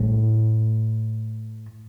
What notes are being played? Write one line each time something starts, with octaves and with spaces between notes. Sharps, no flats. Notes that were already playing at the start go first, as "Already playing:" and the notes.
Already playing: A2